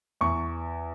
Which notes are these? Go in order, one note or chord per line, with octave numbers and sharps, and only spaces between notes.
E2 C#6